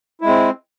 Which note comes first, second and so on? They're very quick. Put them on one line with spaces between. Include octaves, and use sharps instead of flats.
E4 G#3 C4